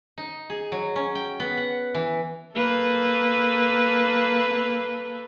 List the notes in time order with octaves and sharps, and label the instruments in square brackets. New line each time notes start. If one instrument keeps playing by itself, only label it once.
[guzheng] D#4
G#4
F#3
C#4
G5
B3
F#5
E3
[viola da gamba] A#3 A4 B4